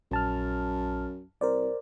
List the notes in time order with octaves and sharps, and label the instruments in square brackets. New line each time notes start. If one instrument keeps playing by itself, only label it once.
[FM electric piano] A#1 A5 F6 [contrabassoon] F#2
[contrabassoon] C2 [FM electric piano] A#4 C5 D5